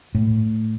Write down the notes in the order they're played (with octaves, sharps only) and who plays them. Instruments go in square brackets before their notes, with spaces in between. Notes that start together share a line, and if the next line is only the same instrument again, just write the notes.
[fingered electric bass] A2